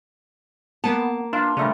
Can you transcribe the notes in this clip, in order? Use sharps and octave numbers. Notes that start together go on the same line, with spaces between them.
A#3 B3 A5
D4 F4
C#3 G3 A3 D4